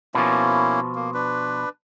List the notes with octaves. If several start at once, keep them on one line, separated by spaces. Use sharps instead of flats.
B2 F3 A#3 C#4 E4
A#3
D4 B4